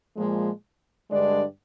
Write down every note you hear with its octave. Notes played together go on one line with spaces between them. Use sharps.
A#2 F3 G#3
G2 D3 G#3 D4 D5